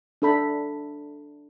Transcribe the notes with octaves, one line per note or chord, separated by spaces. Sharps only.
D4 A4 B5